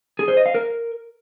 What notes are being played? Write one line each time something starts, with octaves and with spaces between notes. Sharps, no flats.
G#4
C5
D#5
F5
A#4